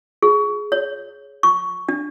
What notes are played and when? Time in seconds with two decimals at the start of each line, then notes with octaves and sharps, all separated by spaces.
0.22 G#4
0.72 C#5
1.43 C#6
1.89 D4